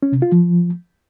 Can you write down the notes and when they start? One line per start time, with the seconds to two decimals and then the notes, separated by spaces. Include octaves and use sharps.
0.03 C#4
0.12 C3
0.22 F4
0.32 F3